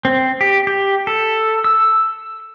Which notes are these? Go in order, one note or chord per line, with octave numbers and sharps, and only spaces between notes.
C4
G4
G4
A4
E6